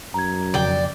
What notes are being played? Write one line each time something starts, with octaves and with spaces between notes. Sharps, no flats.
F#2 A#5 G#6
F2 C#3 D5 G5